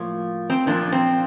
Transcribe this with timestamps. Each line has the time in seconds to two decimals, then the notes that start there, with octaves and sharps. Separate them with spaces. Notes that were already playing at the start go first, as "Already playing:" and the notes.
Already playing: A2 F3 A#3
0.50 C4
0.67 A#2 F3 A#3 D4
0.92 C4